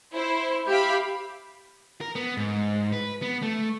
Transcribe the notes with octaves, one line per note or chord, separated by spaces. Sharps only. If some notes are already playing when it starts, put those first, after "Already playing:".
E4 C5
G4 E5 F5 B5
A#4
B3
G#2
B4
B3
A3